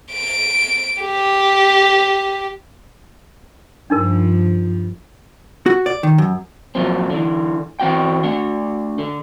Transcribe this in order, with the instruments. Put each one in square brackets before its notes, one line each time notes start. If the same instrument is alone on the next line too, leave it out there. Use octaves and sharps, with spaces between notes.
[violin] D7
G4
[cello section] G2 F3 [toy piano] D4 D#4 A#4
[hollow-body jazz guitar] F#4
D5
D#3
F#2
[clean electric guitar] A#2 F3 F#3 C4
D3 E3
E3 C4 F#4 G5
A3 D4
D3